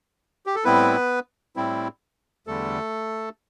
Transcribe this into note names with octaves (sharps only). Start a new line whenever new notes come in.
G4
A4
A2 G3 B3 C4 E4 B4
A2 G3 C4 E4
E2 D3 G3 A3 A4